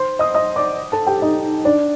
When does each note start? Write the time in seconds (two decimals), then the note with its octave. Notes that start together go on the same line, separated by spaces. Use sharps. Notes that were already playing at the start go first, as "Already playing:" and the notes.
Already playing: C5 C6
0.19 D#5 D#6
0.34 D#5 D#6
0.56 D5 D6
0.92 A4 A5
1.07 G4 G5
1.22 D#4 D#5
1.65 D4 D5